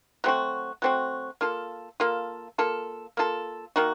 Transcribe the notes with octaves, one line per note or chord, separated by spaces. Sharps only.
F#3 A3 C4 F#4
F#3 A3 C4 F#4
A#3 F4 A4
A#3 F4 A4
A#3 F4 A4
A#3 F4 A4
D#3 A#3 D#4 F#4